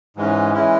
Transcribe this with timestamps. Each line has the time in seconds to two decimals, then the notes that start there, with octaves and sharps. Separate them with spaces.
0.16 G#2 E3 G#3 C#4
0.54 E3 G#3 C#4 E4